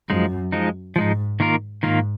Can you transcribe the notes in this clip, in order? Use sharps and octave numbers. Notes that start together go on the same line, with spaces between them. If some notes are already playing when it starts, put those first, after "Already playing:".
F#2 F3 G#3 D#4
F3 G#3 D#4
G#2 F3 G#3 D#4
D#3 A#3 F4 A#4
G#2 D#3 A#3 F4 A#4